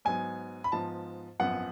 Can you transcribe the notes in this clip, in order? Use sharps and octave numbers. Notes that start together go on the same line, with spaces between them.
G#2 F#3 B3 G#5
B5
G#2 F3 B3 A5
G#1 F#2 F3 B3 F#5